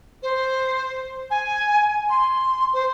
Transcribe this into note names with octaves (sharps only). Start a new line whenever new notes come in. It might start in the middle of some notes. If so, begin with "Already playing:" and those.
C5
G#5
C6
C5